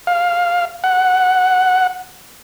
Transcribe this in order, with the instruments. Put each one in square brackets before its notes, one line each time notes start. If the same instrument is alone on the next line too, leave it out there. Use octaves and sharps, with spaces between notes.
[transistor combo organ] F5
F#5